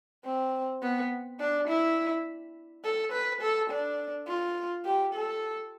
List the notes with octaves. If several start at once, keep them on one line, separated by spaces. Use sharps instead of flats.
C4
B3
D4
E4
A4
B4
A4
D4
F4
G4
A4